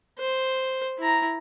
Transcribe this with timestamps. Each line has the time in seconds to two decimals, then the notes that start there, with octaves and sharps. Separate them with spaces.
0.19 C5
0.98 E4 A#5